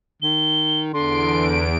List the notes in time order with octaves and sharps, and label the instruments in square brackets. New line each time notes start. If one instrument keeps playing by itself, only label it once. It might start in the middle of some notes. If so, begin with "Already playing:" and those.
[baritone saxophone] D#3 [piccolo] G7
[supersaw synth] E2 D7 [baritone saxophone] D3 [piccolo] C6